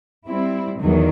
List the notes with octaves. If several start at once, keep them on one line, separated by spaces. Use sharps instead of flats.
G3 C4 E4
E2 D#3 F#3